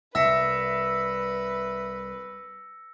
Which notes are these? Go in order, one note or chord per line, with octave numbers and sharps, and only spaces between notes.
C2 B4 E5 E6 A#6 C#7